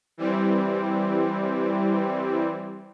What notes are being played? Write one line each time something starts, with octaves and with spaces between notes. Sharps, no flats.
E3 G3 C4